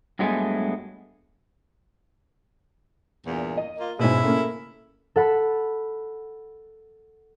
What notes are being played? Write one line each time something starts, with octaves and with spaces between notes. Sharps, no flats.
G2 F#3 G#3 A3 B3 G#5
E2 G2 A#2
D#5
A#3 F4
G#2 B2 G#3 C#4 E4
C#3 A3 A#3
A4 F#5 B5